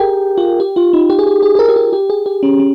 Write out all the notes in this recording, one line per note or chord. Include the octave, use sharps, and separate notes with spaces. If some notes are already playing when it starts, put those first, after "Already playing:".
Already playing: G4 G#4 A#4 G5
F4
G4
F4
D#4
G4
G#4
G4
G#4
G#4
A#4
G4
G#4
G4
G#4
G4
C#4
C#4